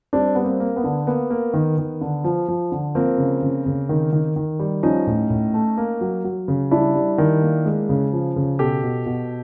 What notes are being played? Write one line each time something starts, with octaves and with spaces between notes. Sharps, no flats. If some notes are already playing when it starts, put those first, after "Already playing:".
G3 C4 D4
G3 B3
A#3 C4
A#3
B3
D3
A#3 B3
A#3
D#3
D#3
D3
F3
F3
D3
F3 A#3 C4
C#3
C#3
C#3
D#3
D#3
D#3
G3
F3 C#4 D#4
A2
A2
A3
A#3
F#3
F#3
C#3
G3 D4 E4
G3
D#3
A#3
G#3
C#3
F3
C#3
B2 G4 A4
B2
B2